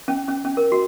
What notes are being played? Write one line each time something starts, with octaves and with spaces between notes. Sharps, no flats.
C#4
C#4
C#4
A#4
F#4